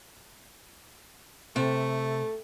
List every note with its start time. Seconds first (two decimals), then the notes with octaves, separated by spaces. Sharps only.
1.56 C3 A3 A4